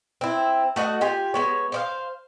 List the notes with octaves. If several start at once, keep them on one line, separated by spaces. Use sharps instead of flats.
C4 E4
A3 F#4 D#5 F#5
F4 G4 G#5
G#3 B3 C#5
C5 D5 F5